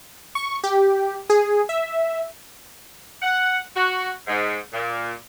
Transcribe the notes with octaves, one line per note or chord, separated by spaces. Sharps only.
C#6
G4
G#4
E5
F#5
F#4
G#2
A#2